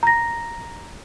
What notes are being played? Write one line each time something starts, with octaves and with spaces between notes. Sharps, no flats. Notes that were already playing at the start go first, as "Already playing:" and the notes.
A#5 A#6